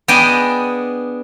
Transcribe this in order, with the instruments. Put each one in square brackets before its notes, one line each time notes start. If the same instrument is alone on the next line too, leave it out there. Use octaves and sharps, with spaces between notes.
[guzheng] B3 D4 G#4 D#5 G5 G#5